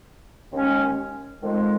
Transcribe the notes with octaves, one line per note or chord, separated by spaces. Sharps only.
D#2 D#3 G#3 C#4
F2 D#3 G#3